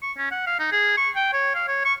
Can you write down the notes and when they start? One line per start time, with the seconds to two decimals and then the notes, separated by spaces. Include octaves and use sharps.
0.02 C#6
0.17 C#4
0.31 F#5
0.47 F5
0.59 D#4
0.72 G#4
0.97 C#6
1.15 G5
1.33 C#5
1.55 F5
1.68 C#5
1.85 C#6